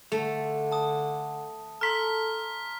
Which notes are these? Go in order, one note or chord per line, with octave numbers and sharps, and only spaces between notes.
D3 A3
A5 D#6
A4 A#5 C6 F6 B6